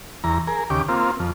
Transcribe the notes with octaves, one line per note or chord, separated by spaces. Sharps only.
E2 A#5
G#4 A#4
D#2 C#3 G4 D6
A#3 C4 F4
F2